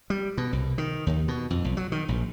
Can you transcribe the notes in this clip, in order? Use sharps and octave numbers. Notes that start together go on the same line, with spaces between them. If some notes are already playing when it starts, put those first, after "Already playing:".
G3
B2
C2
D#3
D#2
B2
F2
B1
F#3
D#3
A#1